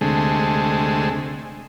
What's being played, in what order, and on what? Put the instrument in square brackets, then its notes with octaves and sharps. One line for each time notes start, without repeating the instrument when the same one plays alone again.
[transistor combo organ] D2 C3 G#3 A3